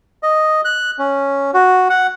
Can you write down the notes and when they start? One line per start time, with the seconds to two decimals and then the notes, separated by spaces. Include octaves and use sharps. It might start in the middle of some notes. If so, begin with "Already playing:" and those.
0.23 D#5
0.65 F#6
0.99 C#4
1.54 F#4
1.90 F#5